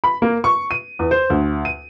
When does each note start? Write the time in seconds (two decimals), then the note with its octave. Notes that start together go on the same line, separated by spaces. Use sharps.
0.04 B5
0.22 A#3
0.44 C#6
0.71 D#7
0.99 E2
1.11 C5
1.30 D2
1.65 D#7